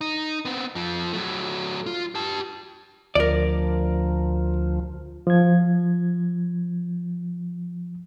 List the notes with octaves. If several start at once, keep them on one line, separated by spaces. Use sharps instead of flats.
D#4
B3 C4
F2 F3
F#3 A3
F4
G4 A5
D2 F3 A#4 D5
F3 G#6